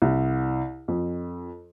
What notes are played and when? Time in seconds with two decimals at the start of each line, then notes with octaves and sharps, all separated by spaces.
0.02 C2
0.88 F2